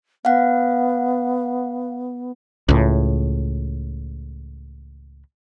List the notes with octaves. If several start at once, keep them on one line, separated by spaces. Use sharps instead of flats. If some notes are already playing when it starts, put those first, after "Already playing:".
B3 F5 F#5
C#2 A2